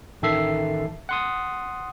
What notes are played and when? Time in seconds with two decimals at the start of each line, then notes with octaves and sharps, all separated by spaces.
0.22 A1 D#3 A4 E5 C7
1.09 F#5 C6 D#6